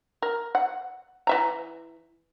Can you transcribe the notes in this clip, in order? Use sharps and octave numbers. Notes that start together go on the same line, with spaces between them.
A#4
F#5
E3 E5 A#5